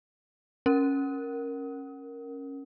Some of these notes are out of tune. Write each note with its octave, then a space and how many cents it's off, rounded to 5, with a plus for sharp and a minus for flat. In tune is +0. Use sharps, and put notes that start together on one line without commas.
C#4 -10 A#4 +0